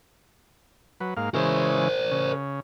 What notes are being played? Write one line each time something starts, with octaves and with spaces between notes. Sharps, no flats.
F#3 B4
G#2 A#3 F5
C#3 E3 G#3 A#4 C5
C#3